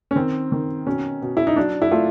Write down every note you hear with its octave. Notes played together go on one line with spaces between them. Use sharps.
C#4
D#3 C4
D#3
B2 C#4
B2
E4
D#4
F#3 D4
E4
A3 F4